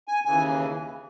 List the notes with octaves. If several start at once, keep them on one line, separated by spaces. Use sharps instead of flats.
G#5
D#2 C#3 E3 G#5